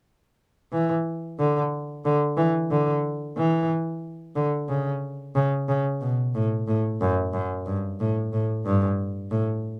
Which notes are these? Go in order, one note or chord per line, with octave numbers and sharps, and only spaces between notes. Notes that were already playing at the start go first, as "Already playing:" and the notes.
E3
D3
D3
E3
D3
E3
D3
C#3
C#3
C#3
B2
A2
A2
F#2
F#2
G2
A2
A2
G2
A2